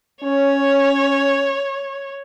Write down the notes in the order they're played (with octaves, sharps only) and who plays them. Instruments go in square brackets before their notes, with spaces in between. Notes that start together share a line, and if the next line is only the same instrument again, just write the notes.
[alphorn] C#4 [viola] C#5